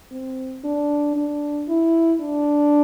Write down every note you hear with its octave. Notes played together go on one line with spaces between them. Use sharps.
C4
D4
D4
E4
D4